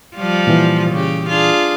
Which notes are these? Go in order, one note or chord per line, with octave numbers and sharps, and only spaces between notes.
F3 G3 F4
A#2 E3
C#3 G4
D4 F4 G#4